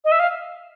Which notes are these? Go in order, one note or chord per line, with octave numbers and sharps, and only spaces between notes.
D#5
E5
F5